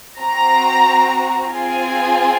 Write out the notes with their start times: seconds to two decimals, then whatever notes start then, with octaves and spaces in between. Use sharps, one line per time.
0.21 C4 F#4 A#5
1.53 C4 F4 G#4 G#5